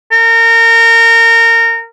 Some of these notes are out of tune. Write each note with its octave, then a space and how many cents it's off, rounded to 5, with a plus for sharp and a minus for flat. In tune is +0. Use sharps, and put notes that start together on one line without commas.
A#4 -25